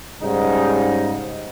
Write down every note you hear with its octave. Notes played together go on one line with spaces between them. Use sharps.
G#2 C#3 G3 D#4